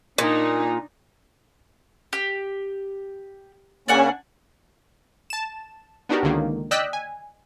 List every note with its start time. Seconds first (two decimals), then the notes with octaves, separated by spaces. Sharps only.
0.18 A#2 D4 D#4
2.13 G4
3.88 C#3 A#3 C#4 D4 F#5 G#5
5.30 A5 E7
6.09 B3 D4 D#4 F#4 G4 A#4
6.23 C#2 D3 D#3 A#3
6.71 D5 D#5 G5 E6 F#6 B6
6.93 G#5